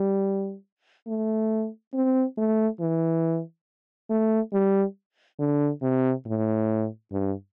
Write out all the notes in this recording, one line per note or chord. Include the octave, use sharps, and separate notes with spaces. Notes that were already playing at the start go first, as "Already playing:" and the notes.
Already playing: G3
A3
C4
A3
E3
A3
G3
D3
C3
A2
G2